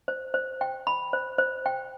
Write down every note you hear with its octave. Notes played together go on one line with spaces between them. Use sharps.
C5
C5
G5
B5
C5
C5
G5